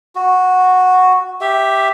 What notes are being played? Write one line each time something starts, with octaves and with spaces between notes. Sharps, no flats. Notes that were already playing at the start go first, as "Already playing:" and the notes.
F#4
G4 E5